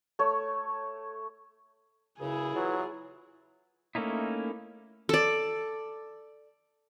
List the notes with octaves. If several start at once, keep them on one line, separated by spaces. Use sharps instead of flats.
A3 C#5
C#2 F#2 C#3 E4 G#4
E2 E3 F#3 F4
A3 A#3 C#4 D#4 E4
A4 D5